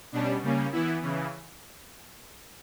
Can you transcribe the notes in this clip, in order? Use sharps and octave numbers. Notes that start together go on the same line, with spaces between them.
B2 G3 C#4 D4
C#3 G3 A#3 C#4
E3 B3 E4
C#3 E3